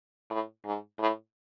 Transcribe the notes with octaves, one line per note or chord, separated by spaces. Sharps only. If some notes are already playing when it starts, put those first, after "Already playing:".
A2
G#2
A2